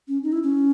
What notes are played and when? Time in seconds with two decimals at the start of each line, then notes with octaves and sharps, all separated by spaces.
0.08 C#4
0.24 D#4
0.32 E4
0.43 C#4